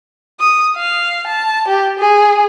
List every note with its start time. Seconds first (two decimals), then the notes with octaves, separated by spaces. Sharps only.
0.40 D#6
0.76 F5
1.27 A5
1.68 G4
1.99 G#4